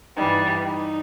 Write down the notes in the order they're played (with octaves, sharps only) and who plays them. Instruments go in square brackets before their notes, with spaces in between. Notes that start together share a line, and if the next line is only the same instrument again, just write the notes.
[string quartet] G2 E3 G3 [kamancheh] D#4
[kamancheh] D#4